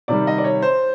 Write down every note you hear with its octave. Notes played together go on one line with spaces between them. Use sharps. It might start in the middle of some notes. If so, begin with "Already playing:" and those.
C3 D#3 G3 D5
D#5
D5
C#5
C5